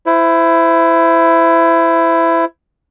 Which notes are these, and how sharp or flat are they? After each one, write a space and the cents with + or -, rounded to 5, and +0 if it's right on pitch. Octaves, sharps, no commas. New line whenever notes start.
E4 +15 C5 -25